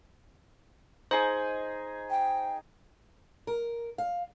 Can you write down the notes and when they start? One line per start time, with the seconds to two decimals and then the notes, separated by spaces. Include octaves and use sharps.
1.11 D#4 G#4 C5 D#5
2.10 G5
3.47 A#4
3.98 F5